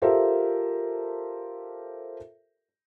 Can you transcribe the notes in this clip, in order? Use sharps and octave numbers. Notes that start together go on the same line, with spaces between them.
F4 G4 A4 A#4 C5 E5